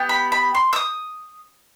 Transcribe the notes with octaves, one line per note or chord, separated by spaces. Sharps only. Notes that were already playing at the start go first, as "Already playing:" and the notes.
Already playing: B3 G4
B5
B5
C6
E6
D#6